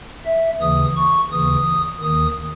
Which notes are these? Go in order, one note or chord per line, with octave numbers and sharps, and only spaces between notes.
E5
D#2 C#3 E3 D#6
C#6
D#2 C#3 E3 D#6
D#2 D#3 D#6